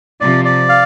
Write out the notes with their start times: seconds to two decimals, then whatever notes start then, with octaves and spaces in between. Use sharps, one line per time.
0.21 C3 F3 D5
0.45 D5
0.69 F5